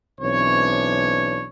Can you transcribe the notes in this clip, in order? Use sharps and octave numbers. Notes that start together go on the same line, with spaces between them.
B1 E3 C4 D4 C#5